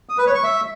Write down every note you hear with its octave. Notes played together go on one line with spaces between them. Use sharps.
D#6
B4
C#5
C#6
E5